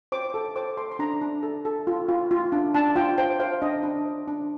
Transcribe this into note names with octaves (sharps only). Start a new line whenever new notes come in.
C5 D6
A4
C5 D6
A4 C6
C6
D4 A#5
D4
A4
A4
F4
F4
F4
D4
D4 A5
F4 G5
C5 G5
C5 F5
D4 D#5
D4
C5
D4